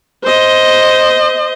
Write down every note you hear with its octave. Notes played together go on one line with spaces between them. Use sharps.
C5 D#5